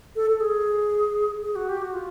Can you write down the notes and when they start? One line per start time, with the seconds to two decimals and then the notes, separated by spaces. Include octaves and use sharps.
0.15 A4
0.30 A4
0.40 G#4
1.43 G#4
1.55 F#4
1.69 G4
1.82 F#4
1.93 F4